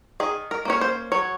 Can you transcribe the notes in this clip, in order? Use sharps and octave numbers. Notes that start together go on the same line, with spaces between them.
D#3 G#4
A#4
A#3 C#4 C#5
C5
F#3 C#5